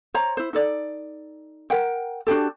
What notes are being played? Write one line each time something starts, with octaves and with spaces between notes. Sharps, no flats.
C5 C#5 A#5
E4 C5
D#4 A4 D5
A#4 F#5 G5
D4 F#4 G4 A4